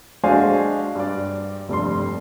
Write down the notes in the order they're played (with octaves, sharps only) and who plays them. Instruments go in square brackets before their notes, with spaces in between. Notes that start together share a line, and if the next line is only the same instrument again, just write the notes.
[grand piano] G#3 D4 F#4 C5 F5 G#5
G2 D5
F1 G2 C6